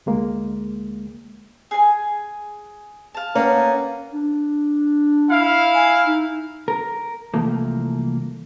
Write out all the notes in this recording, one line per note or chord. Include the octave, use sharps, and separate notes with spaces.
D2 G#3 A#3
G#4 G#5
F5 A5
A#3 B3 C#4
D4
E4 F5
G#5
D#4
A#4
C2 E3 F3 A3 A#3